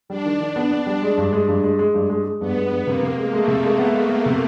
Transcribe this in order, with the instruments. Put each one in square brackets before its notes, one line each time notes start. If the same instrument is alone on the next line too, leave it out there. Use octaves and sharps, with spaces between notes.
[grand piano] G3 [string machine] D4
[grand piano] D#3
D#3
B3
B3
G3
G#3
G2
G#3
G2
G#3
G#3
G2
G#3
G#3
[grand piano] G2 [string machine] B3
[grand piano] G#3
G2
[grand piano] C3 [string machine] A#3
[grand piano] C3
G#3
[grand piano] G#3 [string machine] A3
[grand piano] C3
G#3
B3
G#3
B3
C3